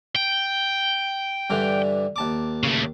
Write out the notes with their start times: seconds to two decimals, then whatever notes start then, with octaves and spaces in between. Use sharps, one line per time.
0.16 G5
1.50 G2 D3 E3
2.16 D#2 A5 D6
2.63 C#3 A3